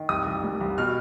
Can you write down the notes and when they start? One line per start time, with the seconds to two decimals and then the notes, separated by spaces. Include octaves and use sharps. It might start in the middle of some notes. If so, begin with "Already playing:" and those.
Already playing: D#3
0.09 C2 D#6
0.27 C2
0.44 G3
0.61 C2
0.78 B2 F6